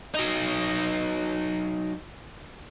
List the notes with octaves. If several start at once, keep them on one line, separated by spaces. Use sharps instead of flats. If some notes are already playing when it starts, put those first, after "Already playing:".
F#3 D#4